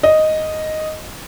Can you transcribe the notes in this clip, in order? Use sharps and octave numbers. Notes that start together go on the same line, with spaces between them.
D#5